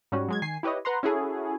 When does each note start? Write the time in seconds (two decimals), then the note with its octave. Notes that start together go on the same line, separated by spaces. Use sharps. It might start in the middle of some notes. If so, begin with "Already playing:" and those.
0.12 G#2 G3 C#4 F#4
0.29 F#3 G#3 G#6
0.42 D#3 G#5 C7
0.63 E4 G4 B4 C#5 D#5
0.85 B4 F#5 A#5 C6
1.03 C#4 E4 F#4 G#4 A4